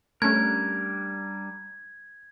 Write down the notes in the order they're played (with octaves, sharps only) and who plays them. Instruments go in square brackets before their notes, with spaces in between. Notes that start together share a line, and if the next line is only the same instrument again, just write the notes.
[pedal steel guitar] G3 D4 A#4 [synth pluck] A3 C#4 [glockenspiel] G#6